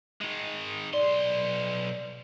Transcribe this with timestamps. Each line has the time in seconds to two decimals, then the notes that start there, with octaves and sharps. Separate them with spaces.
0.21 D#3 G#3
0.94 B1 D5 C6